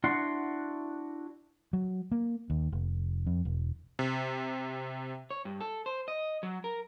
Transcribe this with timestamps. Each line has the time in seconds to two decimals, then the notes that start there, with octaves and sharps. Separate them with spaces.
0.04 D4 E4 F#4 F#5 C6
1.73 F#3
2.12 A#3
2.50 D#2
2.72 F1
3.27 F2
3.45 E1
3.99 C3
5.31 C#5
5.45 G2
5.60 A4
5.86 C5
6.08 D#5
6.43 F#3
6.64 A#4